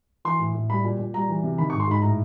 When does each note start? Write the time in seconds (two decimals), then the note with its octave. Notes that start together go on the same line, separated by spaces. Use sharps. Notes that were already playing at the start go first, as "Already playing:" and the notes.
0.25 E3 C6
0.39 A2
0.55 A2
0.69 G3 B5
0.84 A#2
0.99 A#2
1.14 G3 A#5
1.28 E3
1.43 C3
1.58 D#3 B5
1.70 C#6
1.73 G#2
1.80 C6
1.87 G#2 B5
2.02 A2 A#5